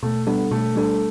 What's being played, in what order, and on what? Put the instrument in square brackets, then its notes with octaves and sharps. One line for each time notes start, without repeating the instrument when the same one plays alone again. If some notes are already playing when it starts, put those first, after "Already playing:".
[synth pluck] B2 [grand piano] A3
[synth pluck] G3 D4 A4 [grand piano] B3
[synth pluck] B2 [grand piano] A3
[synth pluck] G3 D4 A4